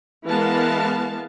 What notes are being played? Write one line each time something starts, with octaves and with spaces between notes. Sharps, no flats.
E3 G#3 B3 A#4 F5 A5